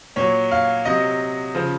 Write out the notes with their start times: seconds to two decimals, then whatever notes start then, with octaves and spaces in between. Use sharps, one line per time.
0.16 A#2 F#3 C#5
0.51 F5
0.85 C3 F#3 D#5
1.55 C#3 F3